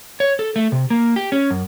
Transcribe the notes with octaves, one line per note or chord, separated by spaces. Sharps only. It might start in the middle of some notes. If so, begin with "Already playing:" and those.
C#5
A4
A3
C3
A#3
G4
C#4
F#2